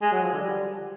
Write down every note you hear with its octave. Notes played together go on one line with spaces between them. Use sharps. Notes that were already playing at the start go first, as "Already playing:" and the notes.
G#3
F#3
F3
D3
G3